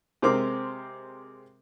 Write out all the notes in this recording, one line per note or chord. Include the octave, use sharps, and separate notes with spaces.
C3 G#3 C4 A#4 D6